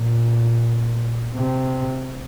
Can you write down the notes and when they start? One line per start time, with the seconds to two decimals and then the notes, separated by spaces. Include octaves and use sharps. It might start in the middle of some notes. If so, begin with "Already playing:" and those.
Already playing: A#2
1.35 C3